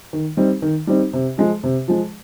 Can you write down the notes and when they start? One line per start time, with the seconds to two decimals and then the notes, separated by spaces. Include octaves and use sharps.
0.13 D#3
0.37 G3 C4 D#4
0.62 D#3
0.87 G3 C4 D#4
1.13 C3
1.38 F3 G#3
1.63 C3
1.88 F3 G#3